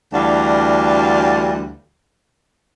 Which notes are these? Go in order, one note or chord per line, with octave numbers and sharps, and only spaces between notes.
D2 E3 G3 D4 F#4 F5